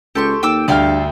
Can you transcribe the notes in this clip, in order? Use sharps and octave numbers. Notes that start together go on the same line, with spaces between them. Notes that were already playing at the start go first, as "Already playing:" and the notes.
C#2 G4 A4 C6 C#6
D#2 G5 D6 E6
D2 G2 A4 D5 F5 G5 F6